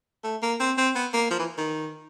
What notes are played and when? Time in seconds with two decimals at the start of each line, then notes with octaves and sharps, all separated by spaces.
0.24 A3
0.43 A#3
0.60 C4
0.78 C4
0.96 B3
1.14 A#3
1.31 F3
1.39 E3
1.58 D#3